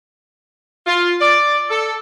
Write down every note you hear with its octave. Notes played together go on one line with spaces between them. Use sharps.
F4
D5
A4